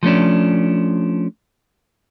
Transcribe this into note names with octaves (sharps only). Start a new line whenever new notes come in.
F3 A3 C#4 D4